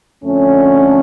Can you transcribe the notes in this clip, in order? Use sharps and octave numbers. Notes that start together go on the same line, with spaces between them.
F2 D3 A3 C#4